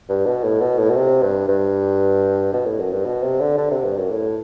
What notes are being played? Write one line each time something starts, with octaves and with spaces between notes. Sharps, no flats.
G2
B2
A2
B2
A2
B2
C3
G2
G2
B2
A2
F#2
G2
B2
C3
D3
D3
C3
G2
F#2
A2